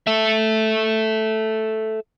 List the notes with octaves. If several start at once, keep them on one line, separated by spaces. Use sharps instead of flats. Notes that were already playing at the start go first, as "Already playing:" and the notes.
A4 E5